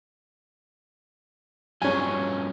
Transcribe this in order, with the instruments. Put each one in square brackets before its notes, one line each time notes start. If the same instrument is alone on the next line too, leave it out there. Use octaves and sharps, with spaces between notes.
[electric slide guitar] G2 F#3 F4 [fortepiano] C#4 G#5